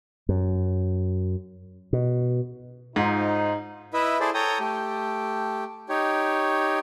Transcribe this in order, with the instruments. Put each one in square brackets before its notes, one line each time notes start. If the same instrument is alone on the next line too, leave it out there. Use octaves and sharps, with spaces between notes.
[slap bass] F#2
B2
[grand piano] G#2 [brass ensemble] D#4 F4 C5
[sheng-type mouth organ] E4 B4 D#5 E5
E4 G#4 A4 C5 D5
A4 C#5 G5 A#5 D#6
A3 G4
D#4 G4 C#5